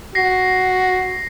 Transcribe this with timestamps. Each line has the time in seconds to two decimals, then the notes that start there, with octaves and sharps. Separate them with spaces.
0.15 F#4 A#6 C7